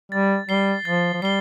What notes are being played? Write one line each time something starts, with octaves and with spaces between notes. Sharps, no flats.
G3 A6
G3 C7 G7
F3 A6
F3
G3 C7 G7